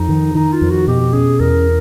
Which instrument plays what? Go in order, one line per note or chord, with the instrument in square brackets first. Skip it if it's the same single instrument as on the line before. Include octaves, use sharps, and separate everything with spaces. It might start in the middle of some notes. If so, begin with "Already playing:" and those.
Already playing: [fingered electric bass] F2 [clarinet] D#4
[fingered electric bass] D#3
[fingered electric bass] D#3 [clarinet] D#4
[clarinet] F4
[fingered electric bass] F2
[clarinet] F#4
[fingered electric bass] B2 [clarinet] G4
[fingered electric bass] C#4 [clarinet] G#4
[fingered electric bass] E2 [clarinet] A#4